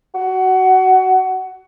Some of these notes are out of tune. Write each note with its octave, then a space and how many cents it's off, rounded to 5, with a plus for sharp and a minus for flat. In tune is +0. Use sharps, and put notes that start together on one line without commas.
F#4 +20